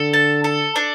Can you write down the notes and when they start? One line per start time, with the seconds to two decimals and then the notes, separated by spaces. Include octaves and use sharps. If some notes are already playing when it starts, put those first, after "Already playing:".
Already playing: D3 A4
0.13 A5
0.44 A4
0.76 D4